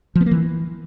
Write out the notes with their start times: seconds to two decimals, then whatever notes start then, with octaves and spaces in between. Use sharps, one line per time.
0.15 F3
0.21 B3
0.26 A#3
0.31 E3